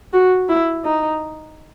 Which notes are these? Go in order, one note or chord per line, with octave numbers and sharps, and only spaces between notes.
F#4
E4
D#4